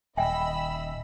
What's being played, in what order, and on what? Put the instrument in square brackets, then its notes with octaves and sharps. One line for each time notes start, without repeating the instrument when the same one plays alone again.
[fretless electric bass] D#1 [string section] D#5 B5 E6 [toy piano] E5 G5 G#5